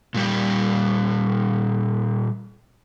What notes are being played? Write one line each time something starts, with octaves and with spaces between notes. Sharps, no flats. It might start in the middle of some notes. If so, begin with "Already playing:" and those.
A#2 G3 G4